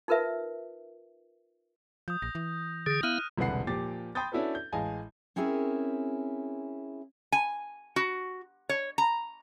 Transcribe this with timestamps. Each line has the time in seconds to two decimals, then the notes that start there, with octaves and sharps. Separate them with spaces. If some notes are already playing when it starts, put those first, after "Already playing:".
0.08 D#4 F4 A#4 B4 E5
2.08 F3 D#6 G6
2.22 A#1 A#6
2.35 E3
2.86 D3 G#4 D#6 G6 A#6
3.03 B3 E4 F5 F6 F#6 D#7
3.38 E1 C2 D3 B4 F#5 C7
3.67 A#2 F3 G4 D6 A6
4.15 G5 B5 C6 D#6 G6 A6
4.32 C#4 D4 E4 F#4 A4 B4
4.55 G6
4.72 A1 G#3 D#5 F5 G#5 A5
5.36 C4 C#4 E4 G#4 A#4
7.32 G#5
7.96 F#4
8.69 C#5
8.98 A#5